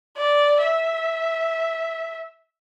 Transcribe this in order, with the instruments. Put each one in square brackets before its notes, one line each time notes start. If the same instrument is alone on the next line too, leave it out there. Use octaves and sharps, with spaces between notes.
[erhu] D5
E5